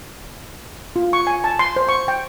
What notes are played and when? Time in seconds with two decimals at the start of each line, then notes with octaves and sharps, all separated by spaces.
0.96 F4
1.13 C#6
1.27 G#5
1.44 A5
1.59 C6
1.76 C5
1.89 C#6
2.08 G5